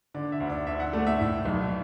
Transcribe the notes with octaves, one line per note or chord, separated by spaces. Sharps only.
D3 D5
E5
D2
D5
D2 E5
F#5
A3 D5
E5
A2
B1